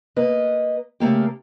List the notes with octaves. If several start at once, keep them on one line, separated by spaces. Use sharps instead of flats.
A#3 B4 D#5
C#3 A3 A#3 G4